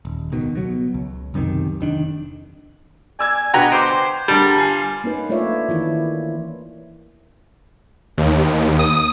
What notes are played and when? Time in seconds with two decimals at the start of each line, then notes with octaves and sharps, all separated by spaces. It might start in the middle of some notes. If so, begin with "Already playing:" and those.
0.05 D#1
0.32 C#2 B2 D#3
0.55 B2 F#3
0.94 C#2
1.34 B1 F#2 C3 D#3
1.81 F1 D#3 D4
3.19 D5 G#5 E6 G#6
3.54 B2 D3 F#4 B4 G5 A#5 G#6
3.72 C5 C6 D6 D7
4.28 G2 D3 G3 A#4 A5
4.58 F4 G#5 C7
5.04 A#3 C#4 D#4 B4
5.30 A3 D4 F4 C#5 D5 E5
5.69 D#3 E3 E4
8.18 D#2
8.79 D#6